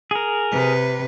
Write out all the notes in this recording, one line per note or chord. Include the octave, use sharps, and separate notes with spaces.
G#4 A#4
C3 B4